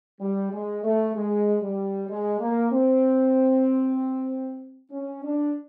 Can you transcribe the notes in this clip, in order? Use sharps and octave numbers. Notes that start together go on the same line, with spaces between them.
G3
G#3
A3
G#3
G3
G#3
A#3
C4
C#4
D4